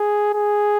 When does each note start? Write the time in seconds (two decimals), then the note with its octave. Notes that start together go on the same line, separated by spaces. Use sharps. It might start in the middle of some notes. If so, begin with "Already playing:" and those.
Already playing: G#4
0.34 G#4